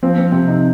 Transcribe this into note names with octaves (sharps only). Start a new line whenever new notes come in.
F3 C4
C4
C3 C4
D#4